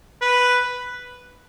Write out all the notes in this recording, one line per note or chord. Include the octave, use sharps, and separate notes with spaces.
B4